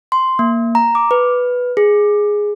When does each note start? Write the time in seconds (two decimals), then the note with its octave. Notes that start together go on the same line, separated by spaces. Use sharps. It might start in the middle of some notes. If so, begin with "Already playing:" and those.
0.12 C6
0.39 A#3
0.75 A#5
0.95 D6
1.11 B4
1.77 G#4